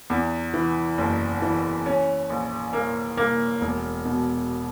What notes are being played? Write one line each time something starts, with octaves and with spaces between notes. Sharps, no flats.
E2
E3
F#1
E3
C#4
A#1
A#3
A#3
E1
B2